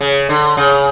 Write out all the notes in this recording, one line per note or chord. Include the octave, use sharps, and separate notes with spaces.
C#3
D3
C#3